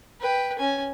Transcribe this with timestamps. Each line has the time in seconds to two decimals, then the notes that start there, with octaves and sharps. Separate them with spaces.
0.21 B4 G5
0.59 C#4 G#5